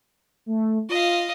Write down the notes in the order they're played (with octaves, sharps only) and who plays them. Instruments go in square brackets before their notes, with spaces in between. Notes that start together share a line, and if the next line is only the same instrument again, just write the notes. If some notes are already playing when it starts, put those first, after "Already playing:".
[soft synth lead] A3
[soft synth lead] F4 [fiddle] D#5 F5